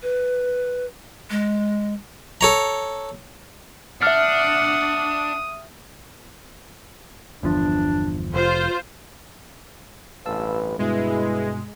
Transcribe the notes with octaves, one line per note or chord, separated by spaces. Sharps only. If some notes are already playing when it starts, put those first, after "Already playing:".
B4
G#3
A4 C#5 A#5
D4 E5 F#5 D#6 F6
G1 E2 F3 D4
F1 F4 C5
A1 G2 B4 F5 A5 E6
G2 B2 G#3 E4 B4